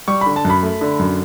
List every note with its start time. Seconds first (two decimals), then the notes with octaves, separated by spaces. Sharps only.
0.08 G3 C#6
0.21 D3 B5
0.36 A5
0.45 F#2
0.50 B5
0.63 A3
0.81 D3
0.99 F#2